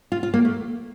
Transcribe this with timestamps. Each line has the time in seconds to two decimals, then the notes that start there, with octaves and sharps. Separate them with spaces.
0.12 F4
0.23 F4
0.34 A#3
0.45 A3